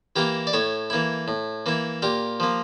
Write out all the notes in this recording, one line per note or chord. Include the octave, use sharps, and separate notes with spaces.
E3 A#3 E4 G4 A#4
D5
A2 A4 C#5
E3 A#3 E4
A2
E3 A#3 E4
A#2 G4 A#4
F3 A#3